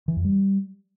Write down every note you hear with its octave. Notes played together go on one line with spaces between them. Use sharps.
E3
F2
G3